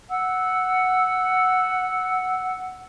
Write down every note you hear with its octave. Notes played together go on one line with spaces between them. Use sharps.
F#5 E6